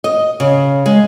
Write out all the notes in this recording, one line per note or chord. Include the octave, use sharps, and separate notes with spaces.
D#5
C#3
G#3